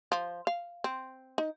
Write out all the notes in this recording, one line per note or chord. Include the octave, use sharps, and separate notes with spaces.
F3
F5
C4
D#4